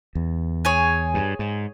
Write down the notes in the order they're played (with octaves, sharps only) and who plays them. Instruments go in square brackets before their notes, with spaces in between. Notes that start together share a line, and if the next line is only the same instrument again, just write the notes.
[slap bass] E2
[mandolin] G#4 C#5 G#5
[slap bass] G2
G#2